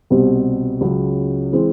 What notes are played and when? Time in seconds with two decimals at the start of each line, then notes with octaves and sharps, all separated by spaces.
0.10 C2 B2 G3 C4
0.81 C#2 C#3 F#3
1.53 E3 G#3 C4